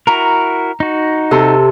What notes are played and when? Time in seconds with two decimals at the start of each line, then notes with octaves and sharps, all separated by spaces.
0.07 E4 F#4 A#4 A#5
0.80 D#4 F#4
1.31 C3 A4 C6